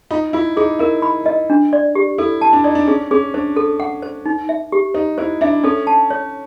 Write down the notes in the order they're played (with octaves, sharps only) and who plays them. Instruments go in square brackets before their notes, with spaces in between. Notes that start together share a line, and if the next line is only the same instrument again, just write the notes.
[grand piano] D#4 [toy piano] F4
[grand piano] E4 [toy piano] F4
[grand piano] D#4 [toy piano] G#4
[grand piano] E4 [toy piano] A#4
[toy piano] B5
D#5
D4
D5
G4
[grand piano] E4 [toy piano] A4
[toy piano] A5
[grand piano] D4
[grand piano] D#4 [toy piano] D5
[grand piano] D4
[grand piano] C#4 [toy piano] G#4
[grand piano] C#4 [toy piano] G#4
[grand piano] D4 [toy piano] C5
[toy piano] A4
F#5
C5
D#4
E5
G4
[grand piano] D#4 [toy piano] C5
[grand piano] E4 [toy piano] C5
[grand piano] D4 [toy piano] E5
[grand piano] C#4 [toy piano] A4
[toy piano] A5
C#5